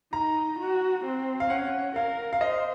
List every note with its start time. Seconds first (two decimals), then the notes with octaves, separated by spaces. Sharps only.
0.13 D#4 A#5
0.59 F#4
1.04 C4
1.40 F5
1.50 C#4 F#5
1.96 A#4 F5
2.33 F5
2.41 C5 D#5